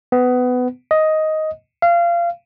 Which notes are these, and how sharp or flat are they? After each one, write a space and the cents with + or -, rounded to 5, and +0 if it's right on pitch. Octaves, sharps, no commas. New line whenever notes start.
B3 +20
D#5 +10
F5 -25